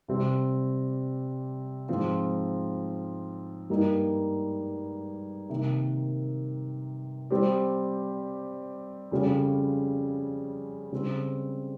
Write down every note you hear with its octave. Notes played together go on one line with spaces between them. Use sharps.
C3 G3 C4 G4
G#2 F3 C4 F4
G2 G3 A#3 D#4
C3 D#3 A#3
G3 C4 G4 C5
F2 C#3 G3 C#4 F4
C#3 G3 C4